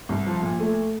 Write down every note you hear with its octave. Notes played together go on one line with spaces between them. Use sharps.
C2
F3
A#2
A3